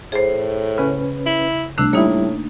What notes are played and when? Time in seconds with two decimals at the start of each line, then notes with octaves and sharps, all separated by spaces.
0.12 A2 G#4 C5
0.78 C#3 C#4 B4
1.26 E4
1.78 C2 A3 D4 E6 F#6
1.93 A2 G3 A#3 D#4 E4